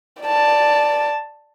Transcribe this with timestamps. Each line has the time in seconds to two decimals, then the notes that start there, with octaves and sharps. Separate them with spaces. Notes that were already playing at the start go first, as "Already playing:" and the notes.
0.22 D5 A5